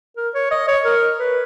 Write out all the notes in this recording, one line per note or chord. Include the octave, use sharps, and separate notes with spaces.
A#4
C#5
D#5
C#5
A#4
B4